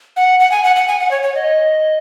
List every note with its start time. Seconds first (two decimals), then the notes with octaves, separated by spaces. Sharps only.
0.17 F#5
0.40 F#5
0.51 G#5
0.64 F#5
0.76 F#5
0.88 G#5
1.00 F#5
1.11 C#5
1.23 C#5
1.35 D#5